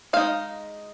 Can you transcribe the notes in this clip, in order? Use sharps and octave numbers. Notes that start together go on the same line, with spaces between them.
G#3 D#4 F5